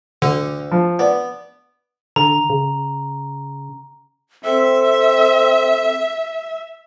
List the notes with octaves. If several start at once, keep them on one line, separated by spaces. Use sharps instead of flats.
D2 D3
F3
B3 D5
D3 A#5
C#3
C4 A4 E5